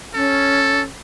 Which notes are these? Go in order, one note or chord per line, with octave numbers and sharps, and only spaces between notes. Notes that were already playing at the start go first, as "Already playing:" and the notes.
C#4 A4